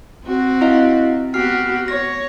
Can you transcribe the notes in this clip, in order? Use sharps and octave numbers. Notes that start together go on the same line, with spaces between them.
C4 F#4
E4 D#5 F5
B3 F#4 G4 F6 C7
C#5 A#6